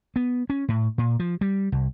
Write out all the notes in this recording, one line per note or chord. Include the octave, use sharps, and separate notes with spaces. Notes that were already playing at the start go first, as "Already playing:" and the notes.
B3
C#4
A2
A#2
F3
G3
C2